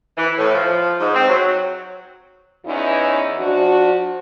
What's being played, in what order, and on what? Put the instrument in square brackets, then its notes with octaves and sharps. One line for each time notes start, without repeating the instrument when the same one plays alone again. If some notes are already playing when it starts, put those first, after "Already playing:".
[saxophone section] E3
A2
F3
G#2
C4
F#3
[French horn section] E2 E3 C#4 D#4 E4
F3 D4 F#4